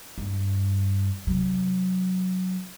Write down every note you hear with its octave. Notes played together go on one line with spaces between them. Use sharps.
G2
C3 F#3